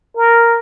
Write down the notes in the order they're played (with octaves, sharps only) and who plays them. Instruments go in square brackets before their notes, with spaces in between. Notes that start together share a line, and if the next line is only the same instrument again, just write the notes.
[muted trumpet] A#4